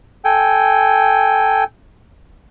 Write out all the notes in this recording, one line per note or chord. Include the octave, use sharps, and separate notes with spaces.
A4 G5 G#5